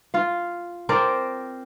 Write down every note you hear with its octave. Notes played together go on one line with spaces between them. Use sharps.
F4 F5
C4 A#4 C5 D5